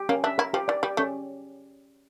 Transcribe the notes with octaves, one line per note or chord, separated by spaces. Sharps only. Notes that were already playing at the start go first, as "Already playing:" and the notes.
Already playing: G4
A#3 C#4
D4 E5
E4 A#4
F3 G4
E3 D5
G3 G4
A3 C#4